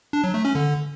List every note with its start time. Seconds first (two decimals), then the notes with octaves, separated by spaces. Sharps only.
0.13 D4
0.24 F#3
0.34 A3
0.45 C#4
0.55 D3